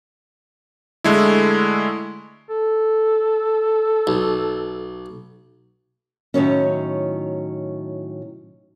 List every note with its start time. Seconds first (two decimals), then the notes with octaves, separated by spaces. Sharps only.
1.04 D3 G#3 A3 E4
2.49 A4
4.07 B1
6.34 A2 D#3 F#3 C#4